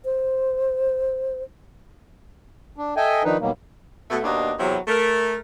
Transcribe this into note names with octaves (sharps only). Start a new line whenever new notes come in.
C5
D4
A4 D#5 E5 G5 G#5
D#3 F3 D4 D#4 B4
B2 D#3 F#3 G3 A#3
B2 A3
D#2 B2 A#3 D4 D#4
E2 C3 E3 F#3
A3 A#4